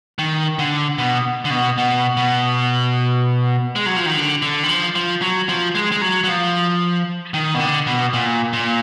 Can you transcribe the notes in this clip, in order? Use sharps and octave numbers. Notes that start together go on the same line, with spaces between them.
D#3
D3
B2
D3
B2
B2
B2
G#3
F#3
F3
D#3
D3
D3
D#3
F3
F3
F#3
F3
G#3
G#3
F#3
F#3
F3
D#3
B2
D3
B2
A#2
A#2